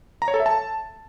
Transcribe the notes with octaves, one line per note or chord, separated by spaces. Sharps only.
A#5
C#5
A4
E5
A5